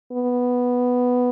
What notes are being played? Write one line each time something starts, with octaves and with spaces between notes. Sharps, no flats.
B3